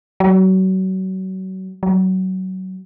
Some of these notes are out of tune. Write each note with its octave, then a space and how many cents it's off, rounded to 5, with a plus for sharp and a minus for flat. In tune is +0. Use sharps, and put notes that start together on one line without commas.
F#3 +30
F#3 +20